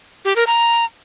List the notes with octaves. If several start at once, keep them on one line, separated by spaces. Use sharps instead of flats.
G4
A#4
A#5